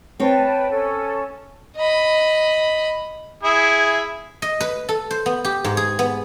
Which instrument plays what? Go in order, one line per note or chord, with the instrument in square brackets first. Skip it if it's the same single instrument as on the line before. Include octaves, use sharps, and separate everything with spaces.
[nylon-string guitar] C4 C#5 [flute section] B4 G5 A5
[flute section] C#4 A4
[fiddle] D#5 B5
[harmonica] E4 G#4
[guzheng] D#5
B4
A4
C5
B3
G4
G#2
G#4
B3